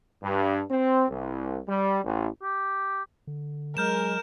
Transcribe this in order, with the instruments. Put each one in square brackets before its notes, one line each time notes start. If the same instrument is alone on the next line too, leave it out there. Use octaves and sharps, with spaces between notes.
[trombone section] G2
C4
C2
G3
A1
[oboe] G4
[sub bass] D3
[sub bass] F#3 [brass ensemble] G#3 [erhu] A#4 [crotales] F6 G6 E7